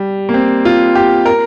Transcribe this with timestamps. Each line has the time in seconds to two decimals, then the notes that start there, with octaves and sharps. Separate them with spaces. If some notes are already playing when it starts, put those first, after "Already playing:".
Already playing: G3
0.29 A#3
0.34 C4
0.65 F4
0.95 G4
1.26 A#4